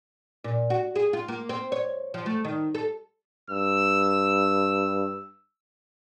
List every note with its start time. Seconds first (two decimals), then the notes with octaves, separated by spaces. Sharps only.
0.44 A#2
0.70 F#4
0.95 G#4
1.13 F4
1.28 A#3
1.49 C4
1.72 C#5
2.14 F3
2.26 A3
2.45 D#3
2.75 A4
3.50 G2 E6